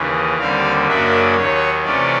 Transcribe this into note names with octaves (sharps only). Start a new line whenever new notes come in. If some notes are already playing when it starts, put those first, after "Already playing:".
Already playing: D#2 C#3 E3
D#2 D3 G3 C4 F5
F#2 C#3 F#3 A#3 D4 E5
D#2 D#3 F#3 C#5
C3 E3 A3 C#4 F4 D5